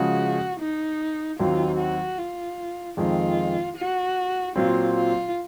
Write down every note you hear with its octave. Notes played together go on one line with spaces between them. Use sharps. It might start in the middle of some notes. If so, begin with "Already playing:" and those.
Already playing: C#3 F3 G#3 F#4
D#4
D#2 D#3 F#3 C4 F4
F#4
F4
F2 D#3 G#3 C4 F4
F#4
A#2 F#3 C4 F4
F4